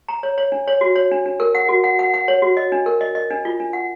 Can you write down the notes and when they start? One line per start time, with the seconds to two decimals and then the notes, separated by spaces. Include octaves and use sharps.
0.08 A#5
0.23 C#5
0.38 C#5
0.52 D4
0.68 C#5
0.81 F#4
0.96 C#5
1.11 D4
1.26 D4
1.40 A#4
1.55 F#5
1.69 F#4
1.84 F#5
1.99 F#5
2.14 F#5
2.28 C#5
2.42 F#4
2.57 D#5
2.72 D4
2.86 A#4
3.01 D#5
3.15 D#5
3.31 D4
3.45 F4
3.60 D4
3.73 F#5